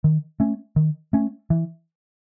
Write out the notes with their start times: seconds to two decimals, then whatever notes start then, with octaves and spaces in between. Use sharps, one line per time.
0.04 D#3
0.40 A3 C#4
0.76 D#3
1.13 A3 C#4
1.50 E3